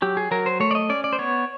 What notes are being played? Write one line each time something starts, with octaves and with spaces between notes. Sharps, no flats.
F#3 G4
G#4
F#3 A#4
C5
A3 C#5
D5
D#5
C#4 D5
D5
C5
B3 C#5